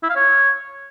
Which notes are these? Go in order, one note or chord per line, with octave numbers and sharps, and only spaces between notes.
E4
F5
C#5